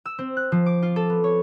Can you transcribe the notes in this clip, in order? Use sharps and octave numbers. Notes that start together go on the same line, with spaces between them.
E6
C4
F#6
F3
D6
F4
A4
B3
C#5